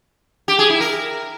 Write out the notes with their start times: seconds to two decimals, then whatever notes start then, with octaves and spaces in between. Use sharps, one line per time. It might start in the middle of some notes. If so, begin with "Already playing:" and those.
0.48 G4
0.59 G#4
0.70 E4
0.80 A#4